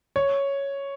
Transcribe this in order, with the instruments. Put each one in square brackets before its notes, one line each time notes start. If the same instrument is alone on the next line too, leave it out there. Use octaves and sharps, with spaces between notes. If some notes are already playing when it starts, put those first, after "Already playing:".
[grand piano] C#5